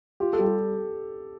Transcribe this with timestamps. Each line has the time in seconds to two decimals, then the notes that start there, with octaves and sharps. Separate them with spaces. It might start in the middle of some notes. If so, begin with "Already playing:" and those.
0.20 F4 G4
0.33 A4
0.39 G3
0.45 G4